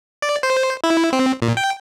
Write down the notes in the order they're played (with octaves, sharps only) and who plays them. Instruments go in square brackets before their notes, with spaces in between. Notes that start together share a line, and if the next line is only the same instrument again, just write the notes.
[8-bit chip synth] D5
C5
E4
C4
A#2
G5